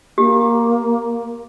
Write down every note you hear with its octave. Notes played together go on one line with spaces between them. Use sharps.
A#3 G4